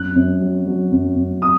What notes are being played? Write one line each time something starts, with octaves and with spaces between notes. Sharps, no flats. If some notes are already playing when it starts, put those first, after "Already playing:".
Already playing: F#2 F#6
F#2
F#3
F#3
F#2
F#2
D#6